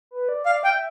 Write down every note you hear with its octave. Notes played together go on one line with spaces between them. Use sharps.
B4
D5
D5 F5
F5 G5
E5